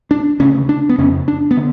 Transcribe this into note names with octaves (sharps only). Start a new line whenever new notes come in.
D4
D2 C#3 C#4
D4
B3
F2 C#3 C#4
D4
B3
D3